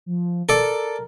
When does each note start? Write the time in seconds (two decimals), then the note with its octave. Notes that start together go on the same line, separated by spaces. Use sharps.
0.06 F3
0.49 A4 A#4 D5